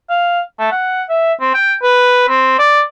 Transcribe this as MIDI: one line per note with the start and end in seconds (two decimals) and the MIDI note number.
0.10 0.41 77
0.59 0.70 57
0.71 1.03 78
1.10 1.33 76
1.41 1.51 60
1.54 1.74 79
1.83 2.25 71
2.28 2.57 60
2.59 2.82 74